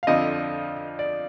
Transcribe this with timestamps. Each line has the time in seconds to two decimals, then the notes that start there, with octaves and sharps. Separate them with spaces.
0.03 F5
0.07 F2 D3 F3 D#5
0.99 D5